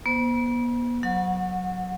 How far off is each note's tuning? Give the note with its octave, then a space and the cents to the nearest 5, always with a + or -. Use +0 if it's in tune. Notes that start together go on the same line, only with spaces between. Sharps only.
B3 -40 C5 -20
F#3 -5 F#5 -25